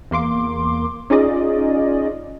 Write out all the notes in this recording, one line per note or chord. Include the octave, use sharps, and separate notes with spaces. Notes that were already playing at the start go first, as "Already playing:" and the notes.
E2 A#3 C6 D6
C#4 D#4 F4 G#4 D5 D#5